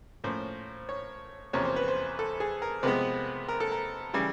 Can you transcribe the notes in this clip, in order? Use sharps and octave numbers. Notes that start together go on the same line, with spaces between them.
A2 F3 A#3 C#4 C5
C#5
E2 C3 F3 A#3 C#4 C#5
C5
B4
C5
A4
G#4
A#4
C3 F3 G#3 B3 B4
A#4
A4
A#4
C#3 E3 G3